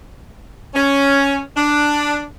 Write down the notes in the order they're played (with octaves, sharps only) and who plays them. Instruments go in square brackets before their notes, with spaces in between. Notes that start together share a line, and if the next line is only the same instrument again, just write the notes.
[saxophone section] C#4
D4